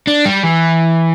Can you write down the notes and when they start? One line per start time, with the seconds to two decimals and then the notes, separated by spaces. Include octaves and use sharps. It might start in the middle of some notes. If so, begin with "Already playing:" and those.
0.07 D4
0.25 G3
0.43 E3